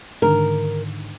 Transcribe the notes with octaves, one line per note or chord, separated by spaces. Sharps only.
G#2 D3 D#3 A#4